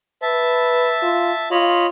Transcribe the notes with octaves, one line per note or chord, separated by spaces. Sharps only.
B4 E5 A5
F4
F4 C#5 D#5 B5